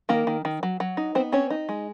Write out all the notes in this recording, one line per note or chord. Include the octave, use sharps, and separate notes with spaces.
D#3 A#3 A#4
D#3
D#3
F#3
F#3
D#4
B3 C4 C5
C4 C#4 C#5
D#4
G#3